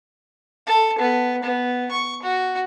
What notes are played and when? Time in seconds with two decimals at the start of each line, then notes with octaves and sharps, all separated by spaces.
0.67 A4
0.98 B3
1.43 B3
1.91 C#6
2.22 F#4